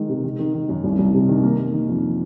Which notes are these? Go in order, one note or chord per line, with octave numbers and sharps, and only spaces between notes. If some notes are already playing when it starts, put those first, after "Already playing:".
Already playing: D#3 G#3
C3
D#3
D#3
D#3
F#2
C2
C2
C3
D#3
A#3
A#3
D#3
F2